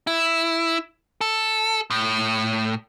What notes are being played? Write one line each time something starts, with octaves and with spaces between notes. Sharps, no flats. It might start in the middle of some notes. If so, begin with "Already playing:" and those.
E4
A4
A2